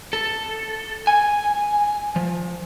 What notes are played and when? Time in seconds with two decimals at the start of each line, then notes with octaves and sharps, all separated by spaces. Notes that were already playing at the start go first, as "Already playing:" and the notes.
0.13 A4
1.07 G#5
2.16 F3